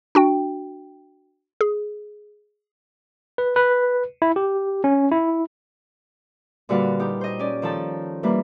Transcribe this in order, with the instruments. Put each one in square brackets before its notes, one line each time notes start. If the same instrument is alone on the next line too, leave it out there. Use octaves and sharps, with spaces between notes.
[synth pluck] D4 F#4 G5
G#4
[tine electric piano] B4
B4
E4
G4
C#4
E4
[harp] A#2 D3 G3 F#4 B4 F5
D#4 G4
C5 D#5
C#4 D5
D#3 F3 A4 A5
E3 G3 A#3 B4